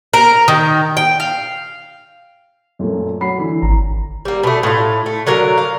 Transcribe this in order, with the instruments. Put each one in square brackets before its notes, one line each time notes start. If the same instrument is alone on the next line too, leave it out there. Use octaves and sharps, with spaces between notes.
[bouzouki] A#4
D#3
G5
F5
[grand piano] F#2 A#2 A3
F#3 B5 C7
D3 E3
[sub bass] G#1 [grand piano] A#5
[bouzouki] G3 A#3
B2 A3
A2 F4
A3
D3 F#3 A#4 F5
F5